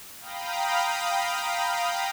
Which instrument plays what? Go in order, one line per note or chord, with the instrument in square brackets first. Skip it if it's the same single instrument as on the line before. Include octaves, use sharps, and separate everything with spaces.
[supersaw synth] F5 G5 A#5 B5 D#6